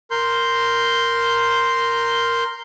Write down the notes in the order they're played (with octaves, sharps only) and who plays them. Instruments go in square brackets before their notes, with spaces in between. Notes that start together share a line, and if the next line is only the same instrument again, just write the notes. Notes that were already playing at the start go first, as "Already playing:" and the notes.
[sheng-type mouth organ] A#4 C6 G6